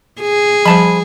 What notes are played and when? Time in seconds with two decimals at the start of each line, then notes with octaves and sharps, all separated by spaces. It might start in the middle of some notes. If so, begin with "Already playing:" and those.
0.21 G#4
0.65 F3 G3 C5 A5 B5